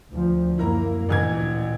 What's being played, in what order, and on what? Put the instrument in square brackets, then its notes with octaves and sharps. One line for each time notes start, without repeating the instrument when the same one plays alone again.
[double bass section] D2 F3
[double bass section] F#2 A#3 [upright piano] E4 A#4 A#5
[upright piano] A1 E3 G#6 [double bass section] D2 A#2